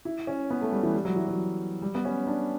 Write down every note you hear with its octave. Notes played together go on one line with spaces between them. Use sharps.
E4
C#4
B3
A3
G3
E3
G3
F#3
E3
F#3
G3
B3
C#4
D4